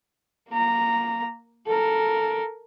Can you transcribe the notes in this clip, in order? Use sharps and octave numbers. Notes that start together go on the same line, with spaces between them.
A#3 A#5
A4 A#4